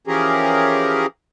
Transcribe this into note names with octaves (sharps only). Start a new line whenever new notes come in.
E3 F3 C#4 G4 G#4 A#4